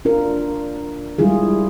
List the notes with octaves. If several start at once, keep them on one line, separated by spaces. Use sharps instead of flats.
D4 F4 A#4
G3 G#3 E4 F4 G#4